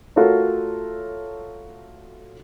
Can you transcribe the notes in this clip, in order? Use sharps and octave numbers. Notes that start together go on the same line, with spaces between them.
A3 F4 F#4 A4 A#4 C#5